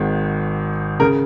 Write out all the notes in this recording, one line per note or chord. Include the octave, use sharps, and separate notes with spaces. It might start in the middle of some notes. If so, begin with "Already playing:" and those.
Already playing: G#1 G#2 D#3
C#3 A#4